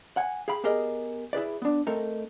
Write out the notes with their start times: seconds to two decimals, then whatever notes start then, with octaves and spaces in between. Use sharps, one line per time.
0.17 F#5 G#5
0.48 G#4 F5 G5 B5
0.64 B3 G4 G#4 A#4 D#5
1.33 E4 G#4 B4 D5
1.62 B3 D4
1.87 A3 C4 D#4 A4 A#4